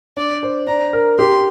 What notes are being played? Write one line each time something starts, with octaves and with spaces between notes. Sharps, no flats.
D4 D5
C5
D4 A#5
A#4
G4 C6